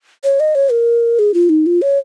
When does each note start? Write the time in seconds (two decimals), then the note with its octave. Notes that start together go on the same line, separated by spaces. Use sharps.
0.24 C#5
0.40 D#5
0.55 C#5
0.71 A#4
1.19 G#4
1.34 F4
1.49 D#4
1.66 F4
1.82 C#5